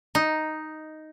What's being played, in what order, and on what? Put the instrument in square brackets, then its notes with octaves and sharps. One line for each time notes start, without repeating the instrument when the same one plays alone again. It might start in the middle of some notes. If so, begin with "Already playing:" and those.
[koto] D#4